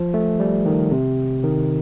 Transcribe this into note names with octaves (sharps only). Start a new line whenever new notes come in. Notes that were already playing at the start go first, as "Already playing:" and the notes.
Already playing: F3
A3
G3
D#3
C3
D#3